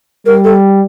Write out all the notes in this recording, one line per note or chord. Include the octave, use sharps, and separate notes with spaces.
G3 A#4
A4